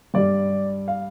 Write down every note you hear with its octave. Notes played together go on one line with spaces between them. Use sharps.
G2 G3 D5
F5